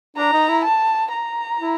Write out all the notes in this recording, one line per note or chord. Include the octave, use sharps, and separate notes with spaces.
D4 A#5
D#4
E4
A5
A#5
E4